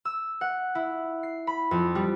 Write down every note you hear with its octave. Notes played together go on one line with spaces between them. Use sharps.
E6
F#5
E4
C7
B5
F2
G3